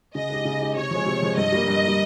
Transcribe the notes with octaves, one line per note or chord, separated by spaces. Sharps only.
C#3 D#5
G#3 D#4 G4
C#3
G#3 D#4 G4
C3 C#5
F3 G#3
C3
F3 G#3
G2 D#5
G3 A#3
G2
G3 A#3